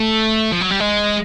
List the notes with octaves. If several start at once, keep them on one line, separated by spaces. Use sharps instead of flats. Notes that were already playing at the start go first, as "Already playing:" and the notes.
Already playing: A3
F3
F#3
G3
G#3